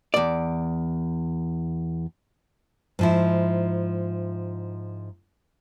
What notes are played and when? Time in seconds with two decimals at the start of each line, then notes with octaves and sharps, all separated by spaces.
0.14 E2 D5
2.99 G#2 F3 E4